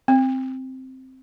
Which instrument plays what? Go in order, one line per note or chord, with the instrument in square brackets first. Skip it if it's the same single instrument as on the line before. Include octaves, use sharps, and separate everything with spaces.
[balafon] C4